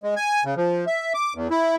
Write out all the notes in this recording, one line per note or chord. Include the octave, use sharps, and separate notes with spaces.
G#3
G#5
C#3
F3
E5
D6
E2
E4